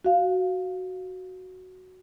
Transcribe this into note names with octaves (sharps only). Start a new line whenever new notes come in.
F#4 F5